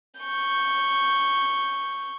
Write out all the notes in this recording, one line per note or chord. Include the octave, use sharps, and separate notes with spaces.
C#6 G6